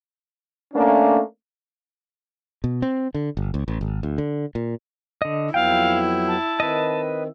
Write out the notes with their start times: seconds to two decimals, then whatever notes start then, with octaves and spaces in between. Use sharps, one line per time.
0.73 A3 A#3 C#4 D4
2.64 B2
2.82 C4
3.14 D3
3.37 G1
3.54 C#2
3.68 A1
3.81 G#1
4.03 D2
4.18 D3
4.55 A#2
5.22 D3 D#5
5.54 F2 F#3 B3 E4 F5 G5
6.28 A5
6.60 D#3 C4 B4 D#5